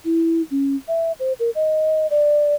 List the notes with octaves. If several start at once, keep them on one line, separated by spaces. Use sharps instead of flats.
E4
C#4
E5
C5
A#4
D#5
D5